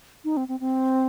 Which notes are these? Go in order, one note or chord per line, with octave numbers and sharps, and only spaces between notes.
D#4
C4
C4
C4